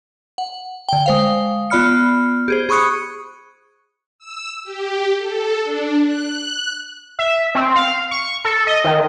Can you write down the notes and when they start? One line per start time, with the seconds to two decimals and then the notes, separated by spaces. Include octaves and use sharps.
0.38 F#5
0.89 D3 G5
1.06 G#3 C5 F5
1.70 B3 F4 D5 B5 F6 C#7
2.48 G4 G#4 C5
2.69 G#4 B5 C#6 D#6 F#6 C#7
4.19 E6
4.64 G4
5.18 A4
5.62 D4
6.03 F#6
7.19 E5
7.55 C4
7.76 F5
8.11 C#6
8.45 A4
8.67 D#5
8.84 D#3